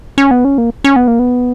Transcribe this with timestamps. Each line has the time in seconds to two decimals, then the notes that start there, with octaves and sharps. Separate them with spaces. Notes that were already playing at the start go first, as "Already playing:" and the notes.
0.18 C#4
0.31 B3
0.45 C#4
0.58 A#3
0.84 C#4
0.96 B3
1.08 A#3
1.19 B3